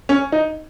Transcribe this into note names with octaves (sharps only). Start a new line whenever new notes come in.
C#4
D#4